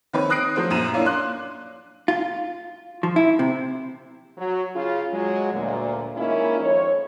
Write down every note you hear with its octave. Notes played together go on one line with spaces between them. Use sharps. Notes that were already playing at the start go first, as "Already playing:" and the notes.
D#3 C4 B4 C#5
D#6 F#6 A#6 C7 D7
F3 F#3 A3 F4 C5
F#2 A#2 A#5 D#7 E7
A#3 C#4 D4 E4 C#5 F5
C6 D6 F#6
F4
F3
E4
C3
F#3
C#3 F4
F#3 G#3
D2 A#2
D#3 G#3 A#3 C#4 E4 F4
F2 C#5